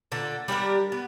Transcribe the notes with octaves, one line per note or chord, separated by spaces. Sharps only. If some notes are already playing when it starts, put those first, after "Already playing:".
A#2 D3 A4
G3 D4 G4 A#4
B3